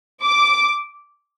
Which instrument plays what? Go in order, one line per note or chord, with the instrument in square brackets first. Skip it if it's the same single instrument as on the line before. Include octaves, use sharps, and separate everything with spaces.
[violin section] D6